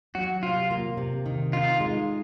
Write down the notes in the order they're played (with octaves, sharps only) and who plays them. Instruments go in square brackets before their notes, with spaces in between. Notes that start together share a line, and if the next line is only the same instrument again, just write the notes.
[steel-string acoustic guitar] F#3 [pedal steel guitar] F#4
[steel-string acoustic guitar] C3 [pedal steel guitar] F4
[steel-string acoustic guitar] A#3
C3
D#3
[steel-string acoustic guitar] D#4 [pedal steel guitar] F4
[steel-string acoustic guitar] G#3